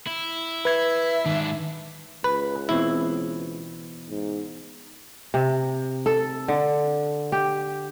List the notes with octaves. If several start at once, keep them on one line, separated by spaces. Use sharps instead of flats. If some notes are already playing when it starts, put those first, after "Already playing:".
E4
B4 E5 G#6
G#2 D#3 D4
C#2 B4
B2 E3 C4 E4
G#2
C3
A4
D3
G4